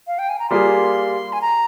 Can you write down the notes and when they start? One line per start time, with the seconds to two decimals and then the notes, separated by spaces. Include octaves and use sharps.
0.07 F5
0.19 G5
0.29 G#5
0.39 A#5
0.50 G3 A#3 F4 G#4 C6
1.33 G#5
1.42 A#5